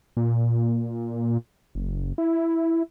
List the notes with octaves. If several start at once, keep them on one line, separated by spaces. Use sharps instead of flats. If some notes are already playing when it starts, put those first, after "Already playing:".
A#2
F#1
E4